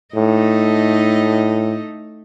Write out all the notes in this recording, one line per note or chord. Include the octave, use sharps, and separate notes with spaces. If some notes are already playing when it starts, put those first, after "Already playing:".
A2 A3 D#4 D#5